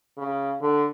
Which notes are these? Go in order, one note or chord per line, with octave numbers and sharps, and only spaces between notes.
C#3
D3